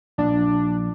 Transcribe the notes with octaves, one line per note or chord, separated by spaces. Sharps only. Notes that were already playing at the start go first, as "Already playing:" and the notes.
A#1 D4